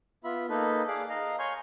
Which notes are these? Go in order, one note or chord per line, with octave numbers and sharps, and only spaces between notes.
B3 F4 E5 B5
A#3 D#4 A4 B4
G#4 D5 F5 D6 F#6
D#5 F5 A#5
C#5 G#5 C6 C#6 F6 G6